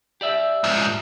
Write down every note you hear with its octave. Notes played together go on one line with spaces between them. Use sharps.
G4 D5 E5
G#2 F3